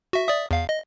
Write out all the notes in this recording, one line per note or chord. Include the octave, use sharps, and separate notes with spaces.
F#4 E5
D5 E5 D#6
E2 F5
D#5